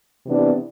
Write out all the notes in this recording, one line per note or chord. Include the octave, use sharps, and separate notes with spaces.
C3 E3 B3 D4